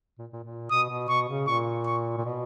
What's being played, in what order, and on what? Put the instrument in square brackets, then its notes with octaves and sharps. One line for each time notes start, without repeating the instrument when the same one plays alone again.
[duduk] A#2
A#2
A#2
[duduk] B2 [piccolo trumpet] D#6
[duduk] B2
[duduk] B2 [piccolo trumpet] C#6
[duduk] C#3
[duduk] A#2 [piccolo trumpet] C#6
[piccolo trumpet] C#6
[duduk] A#2
B2